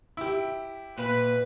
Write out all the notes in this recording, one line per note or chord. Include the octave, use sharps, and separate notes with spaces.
E4 G4
A#2 B4